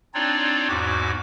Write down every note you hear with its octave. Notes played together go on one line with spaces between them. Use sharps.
C4 D4 D#4 F4 C#5 D5
E2 G#2 F#4 D6